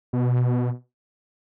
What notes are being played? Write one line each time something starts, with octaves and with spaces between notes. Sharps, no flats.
B2